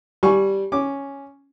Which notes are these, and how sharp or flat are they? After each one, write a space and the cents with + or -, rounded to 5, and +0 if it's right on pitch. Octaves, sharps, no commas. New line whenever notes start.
G3 -5 G#5 +10 C#6 +0
C#4 +0 D6 +0